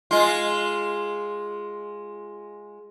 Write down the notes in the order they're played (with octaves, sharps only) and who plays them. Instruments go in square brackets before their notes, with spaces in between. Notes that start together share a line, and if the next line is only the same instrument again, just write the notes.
[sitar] G#3 F4